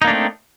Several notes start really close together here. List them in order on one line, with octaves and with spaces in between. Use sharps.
D#4 A#3 D4 A3 C4